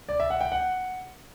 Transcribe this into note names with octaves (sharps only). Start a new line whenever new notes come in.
D5
E5
F#5
G5
F#5